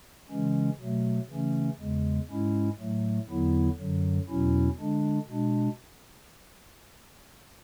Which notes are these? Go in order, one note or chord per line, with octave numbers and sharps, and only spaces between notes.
C#3 E3 G#3 C#4
B2 F#3 A3
C#3 E3 A3 C#4
E2 C#3 G#3
G#2 G#3 C#4 E4
A2 F#3 A3
E2 D3 F#3 B3 E4
F#2 D3 F#3
E2 B2 F#3 C#4 E4
D3 G#3 D4
B2 G#3 D4